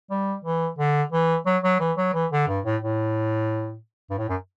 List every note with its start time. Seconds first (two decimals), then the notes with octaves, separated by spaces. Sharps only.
0.11 G3
0.45 E3
0.79 D3
1.12 E3
1.46 F#3
1.63 F#3
1.80 E3
1.97 F#3
2.14 E3
2.32 D3
2.48 G2
2.65 A2
2.82 A2
4.10 G2
4.18 A2
4.29 F#2